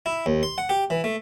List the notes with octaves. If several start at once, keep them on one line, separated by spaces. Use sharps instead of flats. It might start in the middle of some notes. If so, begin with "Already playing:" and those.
E4
D#2
C6
F#5
G4
E3
A3